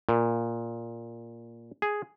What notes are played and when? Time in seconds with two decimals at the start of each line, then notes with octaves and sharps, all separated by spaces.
0.09 A#2
1.82 G#4